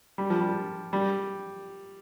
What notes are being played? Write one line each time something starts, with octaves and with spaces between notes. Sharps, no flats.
G3
F3
G3
G3